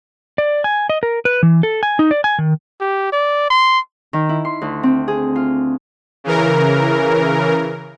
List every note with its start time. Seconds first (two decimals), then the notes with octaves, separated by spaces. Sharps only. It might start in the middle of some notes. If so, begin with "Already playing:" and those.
0.38 D5
0.64 G#5
0.90 D#5
1.03 A#4
1.25 B4
1.43 E3
1.63 A4
1.83 G#5
1.99 D#4
2.11 D5
2.24 G#5
2.39 D#3
2.81 G4
3.12 D5
3.50 C6
4.13 D#3
4.29 E4
4.45 C6
4.62 D2
4.83 C4
5.08 G#4
5.36 F4
6.24 C#3 E3 A#4